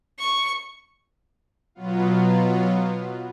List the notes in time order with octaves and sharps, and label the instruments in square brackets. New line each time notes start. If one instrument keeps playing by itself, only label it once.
[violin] C#6
[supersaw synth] B2 F#3 B3 F4